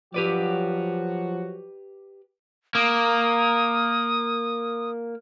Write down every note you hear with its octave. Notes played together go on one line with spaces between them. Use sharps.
F3 F#3 F#4 G4 B4 D5
A#3 D#6